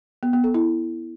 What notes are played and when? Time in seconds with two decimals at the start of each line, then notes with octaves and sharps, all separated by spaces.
0.23 B3
0.33 B3
0.44 A4
0.54 E4